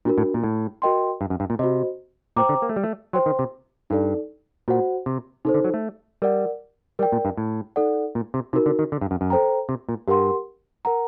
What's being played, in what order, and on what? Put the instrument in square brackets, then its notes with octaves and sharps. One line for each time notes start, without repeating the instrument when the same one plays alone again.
[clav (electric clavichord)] A#2 [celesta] D4 F#4 A#4
[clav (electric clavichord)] A2
A#2
A2
[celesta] F#4 A#4 D#5 G5 C6
[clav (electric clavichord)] G2
F#2
G2
A#2
[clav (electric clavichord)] C3 [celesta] F#4 C5 D#5
[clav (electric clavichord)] A#2 [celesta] C5 G5 A#5 D6
[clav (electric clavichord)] D3
A#3
A3
G3
A3
[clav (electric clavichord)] F#3 [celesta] C5 G5 C6
[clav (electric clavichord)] D#3
C3
[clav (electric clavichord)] G2 [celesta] D#4 A4 D5
[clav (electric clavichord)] A#2 [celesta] F#4 C5 F#5
[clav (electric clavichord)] C3
[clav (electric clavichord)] C3 [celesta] D#4 A4 C5
[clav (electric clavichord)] D3
F#3
A3
[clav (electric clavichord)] G3 [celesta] A#4 D5 F#5
[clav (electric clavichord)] G3 [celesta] A#4 D5 G5
[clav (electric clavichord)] A#2
G2
A2
[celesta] D#4 A4 D5 F#5
[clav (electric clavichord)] A#2
C3
[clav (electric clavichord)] C3 [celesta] D#4 F#4 A#4
[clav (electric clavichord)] D3
D#3
D3
G2
F#2
F#2
[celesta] A4 C5 G5 A#5
[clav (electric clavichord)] C3
A#2
[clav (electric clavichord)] G2 [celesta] G4 A#4 F#5 C6
[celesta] A#4 F#5 A#5